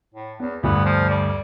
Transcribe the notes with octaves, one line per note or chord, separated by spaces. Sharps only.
A2
E2 B3
D2 G2 B3
F3
G3